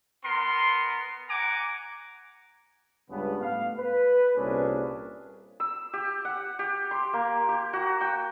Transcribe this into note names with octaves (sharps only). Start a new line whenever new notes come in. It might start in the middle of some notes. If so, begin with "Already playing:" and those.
B3 A#4 C6
F#5 G#5 A#5 D6
C#2 G2 C#3 B3
A2 B3 F5
B4
C2 A#2 C#4 D4 G#4
E6
G4
F#5
G4
C6
A#3
G4
F#4
G5